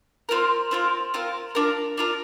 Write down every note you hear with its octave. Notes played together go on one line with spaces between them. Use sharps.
C4 F4 A#4
C4 F4 A#4
C4 F4 A#4
D4 F4 A#4
D4 F4 A#4